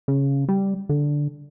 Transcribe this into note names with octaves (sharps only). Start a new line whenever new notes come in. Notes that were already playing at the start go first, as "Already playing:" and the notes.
C#3
G3
D3